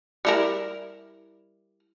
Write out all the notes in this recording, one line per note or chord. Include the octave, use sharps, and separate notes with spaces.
G3 E4 A#4